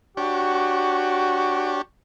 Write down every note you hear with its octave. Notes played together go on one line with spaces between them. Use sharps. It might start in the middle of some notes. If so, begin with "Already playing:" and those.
D4 F#4 G4 C#5